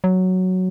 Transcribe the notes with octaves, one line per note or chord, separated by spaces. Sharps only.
F#3